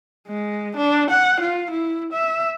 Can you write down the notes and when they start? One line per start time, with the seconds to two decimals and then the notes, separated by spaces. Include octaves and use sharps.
0.28 G#3
0.76 D4
1.10 F#5
1.40 F4
1.71 E4
2.13 E5